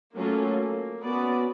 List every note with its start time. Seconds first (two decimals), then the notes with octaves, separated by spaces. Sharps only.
0.15 F#3 A3 A#3 C#4 F4 A4
1.03 B3 C#4 F#4 B4 D5